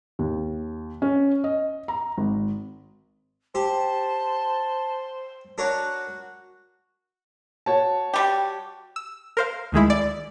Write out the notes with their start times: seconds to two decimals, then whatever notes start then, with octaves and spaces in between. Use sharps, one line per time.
0.19 D#2
1.02 C#4
1.44 D#5
1.88 A#5
2.18 G#1
3.55 G4 C5 A5
5.58 D4 F#4 A#4 C#5
7.66 F#4 C#5 A5
8.14 G3 G4
8.96 E6
9.37 A#4 C5 F5
9.72 D2 D#3 G#3 E4
9.90 D5